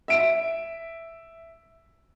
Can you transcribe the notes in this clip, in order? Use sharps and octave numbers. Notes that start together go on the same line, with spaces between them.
E5 D7